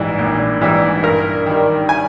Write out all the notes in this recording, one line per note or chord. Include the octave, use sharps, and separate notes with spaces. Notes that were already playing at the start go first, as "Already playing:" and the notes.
Already playing: A#1 G#2 E3 G3
A#1
G#2 E3 G3
G2 A#4
D#3 G3
G#5